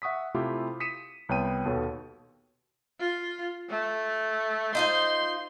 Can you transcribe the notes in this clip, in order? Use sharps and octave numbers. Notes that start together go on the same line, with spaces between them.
E5 F#5 C#6 D#6 B6
C3 A3 E4 F4 G4
D#6 B6 C#7 D#7 E7
C2 B3 C#5 G5 D#7
D#2 B2 A4 C#5
F4
A3
D#4 F4 C5 C6